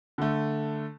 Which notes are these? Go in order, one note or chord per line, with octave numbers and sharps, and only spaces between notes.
D3 A3